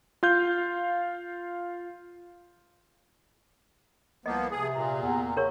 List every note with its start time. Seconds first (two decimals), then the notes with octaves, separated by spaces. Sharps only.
0.23 F4 F5 G6
4.26 C2 F3 A#3 B3 D#5
4.51 C3 G#4
4.75 A#2 A#5
5.02 E2
5.37 C#3 A#4 C#5 C#6